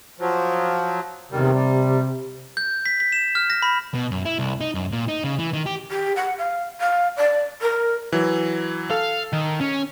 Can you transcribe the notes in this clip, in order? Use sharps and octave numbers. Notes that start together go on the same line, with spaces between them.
F3 F#3
E2 C3 D#3 G3
G3
G6
B6
B6
E7
F6
A#6
B5
B2
F#2
E4
C2
D#4
F#2
A#2
D#4
C#3
E3
D#3
G4
G4
F#5
F5
F5
D5
A#4
E3 F#3
A4 F5
D#3
C#4